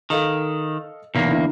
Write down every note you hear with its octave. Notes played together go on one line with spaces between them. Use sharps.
D#3 A4 D#5 F5
B1 E2 A#3
D3 E4